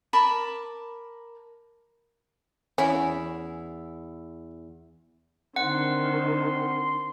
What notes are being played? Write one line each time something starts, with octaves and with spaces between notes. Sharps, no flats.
A#4 A5 B5 D6
E2 C#4 E4 B5
D3 D#3 C4 F#5 C6